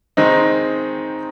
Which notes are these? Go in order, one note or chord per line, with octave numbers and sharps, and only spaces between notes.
D#3 G#3 C4 D#4